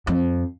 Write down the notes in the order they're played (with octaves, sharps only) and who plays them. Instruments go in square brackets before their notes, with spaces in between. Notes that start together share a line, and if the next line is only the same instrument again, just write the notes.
[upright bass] F2